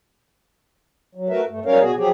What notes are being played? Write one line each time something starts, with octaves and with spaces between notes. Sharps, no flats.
F#3
A3 F#4 A#4 B4 E5
G2 A3
F#3 G3 C#4 A#4 C#5 F5
B2 B3 F#4 G#4
F3 F#3 G4 G#4